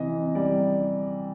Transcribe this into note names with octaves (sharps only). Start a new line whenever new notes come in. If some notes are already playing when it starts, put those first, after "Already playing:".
Already playing: C3 E3 D#5
G3 D5